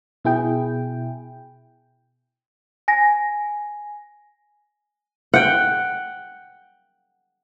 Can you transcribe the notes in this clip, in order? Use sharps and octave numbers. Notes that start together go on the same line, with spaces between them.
B2 E4 G#4 G5
G#5 A#6
F#5 G5